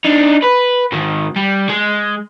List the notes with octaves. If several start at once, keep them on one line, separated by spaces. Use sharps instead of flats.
D4 D#4
B4
G#2 D#3
G3
G#3